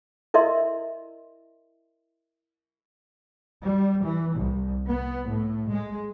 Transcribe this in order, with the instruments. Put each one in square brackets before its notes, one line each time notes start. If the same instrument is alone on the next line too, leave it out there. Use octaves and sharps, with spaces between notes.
[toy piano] E4 A#4 D#5 E5 C6
[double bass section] G3
E3
C2
B3
A2
G#3